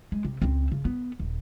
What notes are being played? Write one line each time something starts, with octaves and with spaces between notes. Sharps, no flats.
G#3
C3
C#2 C4
C#3
B3
D#1